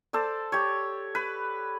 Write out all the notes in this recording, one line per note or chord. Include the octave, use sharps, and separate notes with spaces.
A4 C5 D5
G4 C#5
B4